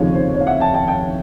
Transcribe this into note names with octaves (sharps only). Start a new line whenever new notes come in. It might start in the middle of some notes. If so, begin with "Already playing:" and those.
Already playing: F1 D#2 C#3 F3 C#5
C5
C#5
F5
E5 F#5
G5 A5
G5 A5
G5 A5